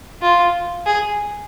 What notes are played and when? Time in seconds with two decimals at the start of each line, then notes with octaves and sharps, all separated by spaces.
0.22 F4
0.86 G#4